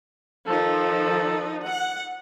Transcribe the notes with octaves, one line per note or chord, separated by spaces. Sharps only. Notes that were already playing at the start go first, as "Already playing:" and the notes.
D#3 F3 D#4 A4
F#5